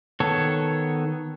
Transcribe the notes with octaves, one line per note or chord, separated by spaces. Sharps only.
D#3 B3 A4 C#5